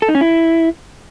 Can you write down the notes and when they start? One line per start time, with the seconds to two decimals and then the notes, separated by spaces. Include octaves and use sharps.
0.02 A4
0.08 D#4
0.15 C#4
0.21 E4